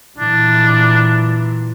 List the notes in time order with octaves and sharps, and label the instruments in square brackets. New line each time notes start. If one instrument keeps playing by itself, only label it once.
[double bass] A#2 E3 [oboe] D4